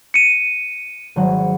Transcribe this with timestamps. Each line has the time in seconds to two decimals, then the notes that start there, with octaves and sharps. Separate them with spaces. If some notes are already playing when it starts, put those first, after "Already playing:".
0.14 C#7 D#7
1.16 G#1 F#3 F#5